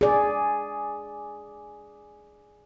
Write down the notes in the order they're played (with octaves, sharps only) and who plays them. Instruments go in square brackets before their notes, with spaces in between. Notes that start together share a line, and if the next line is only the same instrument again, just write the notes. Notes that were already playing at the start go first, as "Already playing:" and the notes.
[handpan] G#4 D5